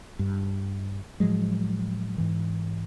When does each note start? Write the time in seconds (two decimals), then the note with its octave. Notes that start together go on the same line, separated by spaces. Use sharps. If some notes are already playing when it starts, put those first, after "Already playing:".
0.19 G2
1.20 A2 F3 F#3 G#3
2.18 G#2 E3